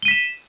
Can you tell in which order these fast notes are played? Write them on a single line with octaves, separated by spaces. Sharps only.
G7 D#7 B6 E7